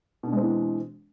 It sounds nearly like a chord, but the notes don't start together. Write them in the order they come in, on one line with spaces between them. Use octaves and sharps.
B2 D4 G#3 C4 E3